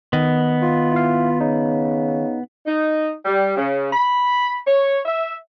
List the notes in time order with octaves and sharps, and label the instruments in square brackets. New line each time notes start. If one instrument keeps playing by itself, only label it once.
[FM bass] D#3 [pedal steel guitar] B3 [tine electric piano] D#5
[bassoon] F4
[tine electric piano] E4 F5
[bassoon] C#3 [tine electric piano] D#4
[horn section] D#4
G3
C#3
B5
C#5
E5